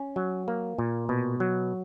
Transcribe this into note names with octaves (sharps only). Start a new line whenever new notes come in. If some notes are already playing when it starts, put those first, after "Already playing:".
Already playing: C#4
F#3
A#3
A#2
B2
F#3